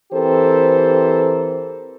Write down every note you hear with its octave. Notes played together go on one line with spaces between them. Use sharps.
E3 C4 G4 A4 A#4 C5